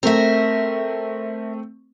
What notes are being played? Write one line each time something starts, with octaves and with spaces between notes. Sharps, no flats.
A3 C4 A#4 E5